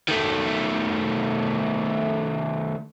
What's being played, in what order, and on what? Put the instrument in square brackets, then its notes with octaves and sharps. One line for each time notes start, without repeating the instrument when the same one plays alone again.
[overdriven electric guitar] D#3 A3